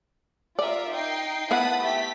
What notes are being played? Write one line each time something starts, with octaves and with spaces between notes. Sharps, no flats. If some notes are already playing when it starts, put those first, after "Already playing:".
F4 A#4 D5 E5
D#4 G5 C7
B3 E4 F#5 A5 B5 D#6
A3 G4 B6